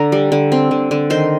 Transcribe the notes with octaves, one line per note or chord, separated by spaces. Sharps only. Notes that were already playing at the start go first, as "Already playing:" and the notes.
Already playing: D3 A#5
G3
D3
C4
D3
D3
D#3 C5